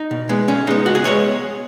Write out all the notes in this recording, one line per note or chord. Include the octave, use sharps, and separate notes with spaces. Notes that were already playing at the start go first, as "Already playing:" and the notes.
Already playing: D#4
B2
G#3 B3
B2 C#4
G#3 B3 D#4
C#2 F#4
G#4
G#3 B3 C#5